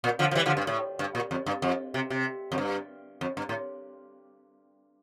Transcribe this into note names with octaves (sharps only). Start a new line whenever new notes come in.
A#2
D3 F3
F3
E3 G3
D3 F3
G2
A2
G2
A#2
F2
G2
F2
C3
C3
F2
G2
F2
G2
A2